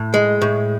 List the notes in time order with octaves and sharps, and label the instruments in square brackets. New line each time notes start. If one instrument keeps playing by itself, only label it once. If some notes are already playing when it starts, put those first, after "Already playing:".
Already playing: [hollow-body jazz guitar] A2
G#3
A2